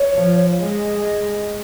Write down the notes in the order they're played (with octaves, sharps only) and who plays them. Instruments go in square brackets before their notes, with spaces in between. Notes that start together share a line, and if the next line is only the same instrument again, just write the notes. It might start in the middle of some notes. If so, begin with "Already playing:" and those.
Already playing: [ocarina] C#5
[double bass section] F3
G#3